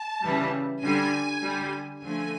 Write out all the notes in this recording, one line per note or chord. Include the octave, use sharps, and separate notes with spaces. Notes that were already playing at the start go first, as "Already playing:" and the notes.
Already playing: A5
C#3 E3 G3
D3 G3 G#5
D3 G3
D3 F3 A3 G#5